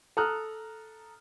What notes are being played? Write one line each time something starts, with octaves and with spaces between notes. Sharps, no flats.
A4 A#5 D#6 F6 F#6